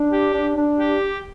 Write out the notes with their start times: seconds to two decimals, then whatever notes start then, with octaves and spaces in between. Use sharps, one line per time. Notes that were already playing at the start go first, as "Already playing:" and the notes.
Already playing: D4
0.11 G4
0.33 D4
0.56 D4
0.78 G4